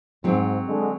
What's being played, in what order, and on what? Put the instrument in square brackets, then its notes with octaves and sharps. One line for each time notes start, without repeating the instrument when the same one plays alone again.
[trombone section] G#2 [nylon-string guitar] F#3 C4
[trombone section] D3 G#3